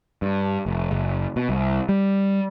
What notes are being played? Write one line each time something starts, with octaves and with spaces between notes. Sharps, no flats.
G2
F1
F#1
B2
C2
G3